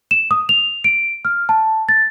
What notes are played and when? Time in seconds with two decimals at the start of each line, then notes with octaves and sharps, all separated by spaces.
0.11 E7
0.31 D#6
0.49 F7
0.84 D7
1.25 F6
1.49 A5
1.89 A6